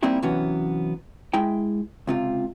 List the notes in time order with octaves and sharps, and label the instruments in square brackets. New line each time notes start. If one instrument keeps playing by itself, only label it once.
[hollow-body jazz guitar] G3 A#3 C4 D#4 E4 G4
C3 E3 F#3 B3 C#4
G#3 E4 G5
C#2 C3 F4